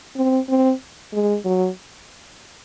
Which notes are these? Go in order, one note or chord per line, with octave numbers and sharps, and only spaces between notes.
C4
C4
G#3
F#3